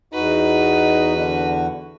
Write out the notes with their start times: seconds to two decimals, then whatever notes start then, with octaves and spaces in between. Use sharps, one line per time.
0.14 E2 D#4 F#4 B4
1.17 D3